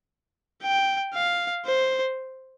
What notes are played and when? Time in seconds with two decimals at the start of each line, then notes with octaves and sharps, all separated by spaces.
0.63 G5
1.14 F5
1.65 C5